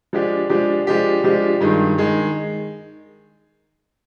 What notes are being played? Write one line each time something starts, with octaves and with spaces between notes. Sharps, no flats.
F3 G#3 D4 G4
F3 G#3 D4 G4
F3 G#3 D4 G4
F3 G#3 D4 G4
G2 D#3 G#3
D#3 G#3